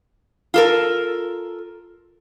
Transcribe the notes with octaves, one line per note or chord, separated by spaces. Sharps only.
F4 A4 A#4